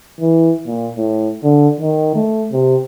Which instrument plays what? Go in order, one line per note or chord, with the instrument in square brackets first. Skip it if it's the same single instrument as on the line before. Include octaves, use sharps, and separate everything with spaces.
[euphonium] E3
A#2
A2
D3
D#3
A3
C3